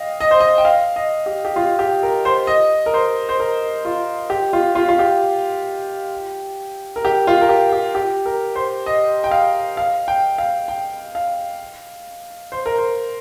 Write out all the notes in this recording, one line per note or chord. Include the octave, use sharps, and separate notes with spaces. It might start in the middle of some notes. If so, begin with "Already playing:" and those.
Already playing: D#5 F5 G5
D#5
C5
D#5
G5
F5
D#5
G4
G4
F4
G4
A#4
C5
D#5
A#4
C5
C5
A#4
F4
G4
F4
F4
F4
G4
A#4
G4
F4
A#4
G4
G4
G4
A#4
C5
D#5
G5
F5
F5
G5
F5
G5
F5
C5
A#4
C5